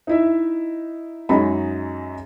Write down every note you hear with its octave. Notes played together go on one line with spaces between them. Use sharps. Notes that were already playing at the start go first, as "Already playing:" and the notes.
D#4 E4 E5
F#2 F#3 G#3 D#4 B5